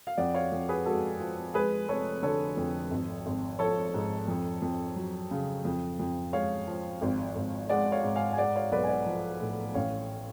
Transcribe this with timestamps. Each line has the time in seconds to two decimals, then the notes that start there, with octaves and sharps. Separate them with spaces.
0.07 F5
0.17 F2 D5 F#5
0.34 C#5 F5
0.52 F2
0.68 G#4 B4
0.86 G#3 F#4 A4
1.20 F3
1.54 G#3 G#4 B4
1.88 F1 A4 C#5
2.23 D3 A4 C#5
2.57 F2
2.91 G#1
3.26 G#1
3.59 F3 A4 C#5
3.94 G#2
4.28 F2
4.62 F2
4.96 F#3
5.31 C#3
5.65 F2
5.99 F2
6.33 G#3 C#5 F5
6.67 F3
7.02 G#1
7.36 G#1
7.69 G#3 D5 F#5
7.92 C#5 F5
8.03 G#2
8.16 F5 G#5
8.33 G#5
8.38 G#3 D5 F#5
8.56 C#5 F5
8.72 B1 B4 D5
8.84 G#5
8.89 D5 F#5
9.06 F3
9.40 A2
9.74 A1 C#5 F5